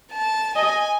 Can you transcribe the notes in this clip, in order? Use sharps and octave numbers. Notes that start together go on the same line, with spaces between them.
A5
D#5 G#5